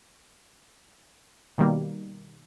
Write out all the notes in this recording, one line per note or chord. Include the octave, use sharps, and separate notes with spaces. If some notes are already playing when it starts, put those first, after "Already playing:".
B2 D#3 G3 A#3